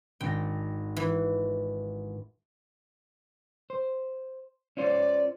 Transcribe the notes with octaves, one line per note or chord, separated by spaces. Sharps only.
G#1 D4 G5 A#6
E3
C5
C#4 F4 C5 D5